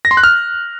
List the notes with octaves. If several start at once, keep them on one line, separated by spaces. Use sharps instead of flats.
A#6
C6
F#6
F6